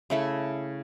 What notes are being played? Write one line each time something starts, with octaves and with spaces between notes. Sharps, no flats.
C#3 A3 E4